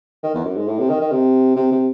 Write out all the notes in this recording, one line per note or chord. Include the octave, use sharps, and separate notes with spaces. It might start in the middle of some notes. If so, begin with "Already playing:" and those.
D#3
E2
F#2
G#2
A2
C3
D#3
D#3
C3
C3
C3